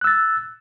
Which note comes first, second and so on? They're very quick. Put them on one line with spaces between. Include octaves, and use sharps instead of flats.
F#6 E6 A6